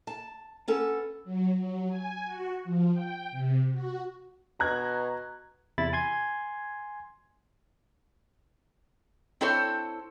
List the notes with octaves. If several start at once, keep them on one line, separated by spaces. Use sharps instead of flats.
A5
B3 C#4 A4
F#3
F#3
G#5
F#4
F3
G5
C3
F#4
B2 A#5 F#6 G#6
E2 C3 E4 B5 A6
G#5 C6 G#6
C4 E4 A4 C5 C#5